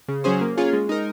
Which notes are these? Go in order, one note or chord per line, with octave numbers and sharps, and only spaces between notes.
C#3
F#3 C#4 G#4 C5
A#3
C#4 F4 G#4 C#5
G#3
D#4 A#4